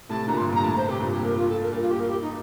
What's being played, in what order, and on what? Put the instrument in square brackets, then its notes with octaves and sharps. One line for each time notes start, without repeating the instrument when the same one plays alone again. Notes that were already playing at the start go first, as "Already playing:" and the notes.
[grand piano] A2 C3 [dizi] A5
[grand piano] A#2 D3 [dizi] A#5
[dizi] C6
[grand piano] G2 A#2
[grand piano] G2 [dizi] A#5
[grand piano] A2 [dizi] A5
[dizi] C5
[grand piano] C3 [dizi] G4
[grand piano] G2 A#2
[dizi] G4
A#4
F4
A4
A#4
[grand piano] G2 A#2 [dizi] A#4
[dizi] F4
G4
A#4
G4
D#4